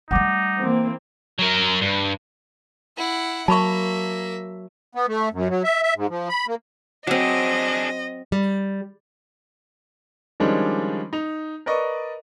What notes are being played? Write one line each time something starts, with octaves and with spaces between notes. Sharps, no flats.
G3 A3 D#4 F#5 D6
E3 A#3 C4
F#3 A#4
G2
E4 F#5
F#3 A#3 E5 A5 B5 C#6
B3
A3
F#2
F#3
E5
E5
G#2
F3
B5
A#3
F#3 C4 D4 G#4 D#5
G3
D#3 F3 G3 G#3 C#4 D4
D#4 F7
A#4 B4 D5 D#5 C#6